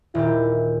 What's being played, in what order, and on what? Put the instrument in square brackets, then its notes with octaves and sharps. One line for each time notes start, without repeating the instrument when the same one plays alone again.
[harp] D#1 A#2 G4 [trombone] E4